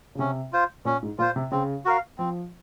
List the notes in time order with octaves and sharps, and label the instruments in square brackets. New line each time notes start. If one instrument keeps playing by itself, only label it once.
[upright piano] C#3
[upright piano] C3 [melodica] C#4
[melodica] F4 C5
[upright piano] A#2 [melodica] C#4
[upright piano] G#2
[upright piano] A#2 [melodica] F4
[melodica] C5
[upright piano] C3
[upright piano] C#3 [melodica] C4
[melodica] F#4 A#4 F5
[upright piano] F3 [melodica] C4